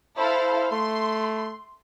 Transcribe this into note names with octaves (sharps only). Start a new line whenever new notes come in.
E4 A4 C5 F5
A3 C6